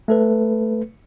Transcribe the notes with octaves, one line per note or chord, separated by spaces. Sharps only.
A3 A4 B4